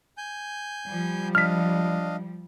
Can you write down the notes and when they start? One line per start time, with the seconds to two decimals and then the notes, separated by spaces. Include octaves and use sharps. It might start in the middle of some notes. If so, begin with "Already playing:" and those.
0.18 G#5 G6
0.87 F3 G3
1.35 D4 D#5 F5 F6 B6